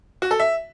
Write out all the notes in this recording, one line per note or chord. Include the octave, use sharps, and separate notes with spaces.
F#4
A4
E5